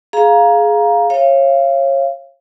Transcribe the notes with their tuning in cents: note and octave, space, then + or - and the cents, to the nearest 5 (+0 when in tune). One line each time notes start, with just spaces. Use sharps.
G#4 +15 F5 +0 A#5 +15
C#5 -25 F5 -30